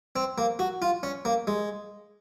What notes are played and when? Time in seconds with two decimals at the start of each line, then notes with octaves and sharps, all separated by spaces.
0.16 C4
0.38 A#3
0.59 F#4
0.82 F4
1.03 C#4
1.25 A#3
1.47 G#3